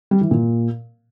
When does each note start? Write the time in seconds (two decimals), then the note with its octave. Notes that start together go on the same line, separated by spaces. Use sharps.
0.11 G3
0.21 E3
0.31 A#2